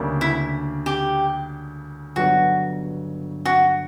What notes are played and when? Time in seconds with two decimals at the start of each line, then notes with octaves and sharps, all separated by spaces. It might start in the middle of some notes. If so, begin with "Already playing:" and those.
Already playing: D2 C#3 G3 A#3 D4
0.21 E4
0.86 G4
2.16 G1 G2 F#3 B3 F#4
3.46 F#4